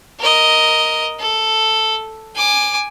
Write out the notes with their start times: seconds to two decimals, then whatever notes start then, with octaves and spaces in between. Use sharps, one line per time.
0.20 A#4 D#5
1.19 A4
2.35 G#5 D6